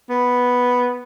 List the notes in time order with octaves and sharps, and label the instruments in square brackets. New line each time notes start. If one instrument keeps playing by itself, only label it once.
[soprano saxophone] B3